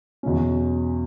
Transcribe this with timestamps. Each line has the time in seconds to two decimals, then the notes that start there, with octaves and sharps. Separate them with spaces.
0.23 E2 B2 F#3 C#4